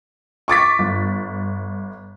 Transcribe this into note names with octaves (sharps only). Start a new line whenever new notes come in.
C#6 D6 A6 B6
G1